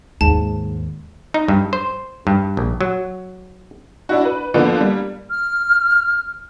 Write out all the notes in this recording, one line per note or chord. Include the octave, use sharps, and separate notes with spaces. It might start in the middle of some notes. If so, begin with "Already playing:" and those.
D#2 G#2 A5
D#4
G2
C5
G2
A#1
F#3
D4 E4 F#4
B4
D3 F3 A#3 B3 D4
G3 A#3
F6